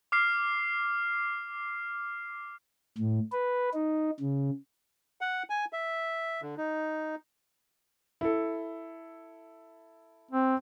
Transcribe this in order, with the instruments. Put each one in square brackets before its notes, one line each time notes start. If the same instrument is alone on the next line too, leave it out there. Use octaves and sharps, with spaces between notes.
[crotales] D6 F6 C7
[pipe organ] A2
B4
D#4
C#3
[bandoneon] F#5
G#5
E5
D3
D#4
[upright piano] E4 A4
[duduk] C4